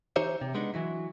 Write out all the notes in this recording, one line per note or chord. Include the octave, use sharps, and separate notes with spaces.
E3 D#4 G4 C5 C#5 E5
C3
G#3 B3 D4 D#4
E3 F#3 E4